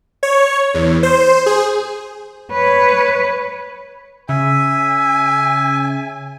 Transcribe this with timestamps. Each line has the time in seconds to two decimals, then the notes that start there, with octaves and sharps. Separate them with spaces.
0.23 C#5
0.74 E2
1.03 C5
1.46 G#4
2.52 B4 C#5
4.29 C#3 E5 G#5